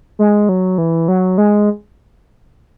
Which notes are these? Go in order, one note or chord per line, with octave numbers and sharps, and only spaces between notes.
G#3
F#3
E3
F#3
G#3